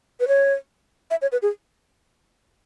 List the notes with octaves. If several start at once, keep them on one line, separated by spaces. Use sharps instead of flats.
B4
C#5
E5
C#5
B4
G#4